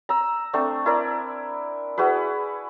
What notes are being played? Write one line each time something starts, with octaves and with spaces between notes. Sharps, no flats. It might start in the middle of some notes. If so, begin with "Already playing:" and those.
A#5 E6
A3 C4 D4
E4 A#4 D5
E4 F#4 G#4 B4